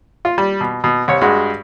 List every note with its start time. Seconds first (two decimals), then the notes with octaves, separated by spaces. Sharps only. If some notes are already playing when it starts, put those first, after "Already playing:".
0.25 F4
0.38 G3
0.61 B2
0.84 B2
1.08 C2 C#5
1.21 G2 G#3 F#4